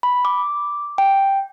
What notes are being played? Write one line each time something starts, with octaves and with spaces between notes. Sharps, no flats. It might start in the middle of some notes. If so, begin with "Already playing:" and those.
B5
D6
G5